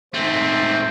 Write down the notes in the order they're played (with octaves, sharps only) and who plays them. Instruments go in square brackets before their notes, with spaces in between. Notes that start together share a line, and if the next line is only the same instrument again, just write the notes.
[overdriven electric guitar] G#2 A3 [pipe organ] C4 C5